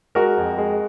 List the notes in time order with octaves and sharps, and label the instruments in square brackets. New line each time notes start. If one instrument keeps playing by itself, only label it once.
[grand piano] G#3 F#4 A#4
F2
G#3